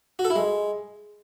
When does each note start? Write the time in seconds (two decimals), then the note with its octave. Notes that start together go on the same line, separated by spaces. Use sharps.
0.19 F#4
0.25 A4
0.30 E4
0.36 G#3